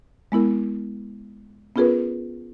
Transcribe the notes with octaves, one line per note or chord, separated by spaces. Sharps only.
G#3 B3 E4 A#4
B3 C#4 F4 G#4 A#4 B4